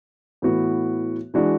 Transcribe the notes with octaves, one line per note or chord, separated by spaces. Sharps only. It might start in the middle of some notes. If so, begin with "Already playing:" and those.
A2 E3 B3 F#4
E3 G#3 D4 F#4